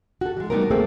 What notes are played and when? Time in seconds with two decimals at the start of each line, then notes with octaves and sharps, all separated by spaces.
0.21 F#4 A4
0.37 E3 G#3
0.50 G3 A3 B3 D#4 A#4
0.70 A3 A#3 C4 G#4 A4